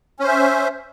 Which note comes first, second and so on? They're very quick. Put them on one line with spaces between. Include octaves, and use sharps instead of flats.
C#4 C5 E5